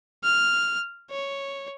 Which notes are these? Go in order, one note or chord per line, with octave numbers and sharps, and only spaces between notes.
F6
C#5